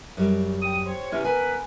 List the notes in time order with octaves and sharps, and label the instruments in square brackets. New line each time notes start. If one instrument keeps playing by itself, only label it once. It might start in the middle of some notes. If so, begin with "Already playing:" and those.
[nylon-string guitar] F#2 G3
[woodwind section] G5 D#6
G4 C5 C#5
[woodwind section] E2 C3 [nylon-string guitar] C#4
[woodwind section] B3 A#4 B4 [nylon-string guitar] G#5